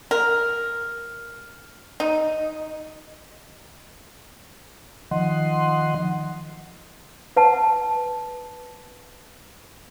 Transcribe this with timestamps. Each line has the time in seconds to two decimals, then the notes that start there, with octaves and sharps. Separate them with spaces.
0.11 A#4
2.00 D#4
5.11 D#3 F3 D#5 F#5 C6
7.36 B4 F#5 A5